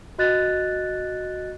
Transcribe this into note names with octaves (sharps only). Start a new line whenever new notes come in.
F#4 D#5 F#6 A6